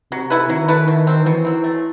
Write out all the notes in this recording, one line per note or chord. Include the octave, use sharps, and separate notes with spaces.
C3 F#3
A3 E4 B4
D#3 F#3
A3 E4 B4
B2
F#3 C4
B2 E3
F#3 C4
A3